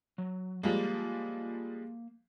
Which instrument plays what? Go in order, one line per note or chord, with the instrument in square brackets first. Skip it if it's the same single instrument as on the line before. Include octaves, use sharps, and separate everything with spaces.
[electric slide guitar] F#3
[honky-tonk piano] F3 G3 G#3 [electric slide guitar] A#3 F5